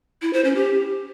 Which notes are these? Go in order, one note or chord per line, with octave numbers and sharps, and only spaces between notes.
E4
C5
C#4
G4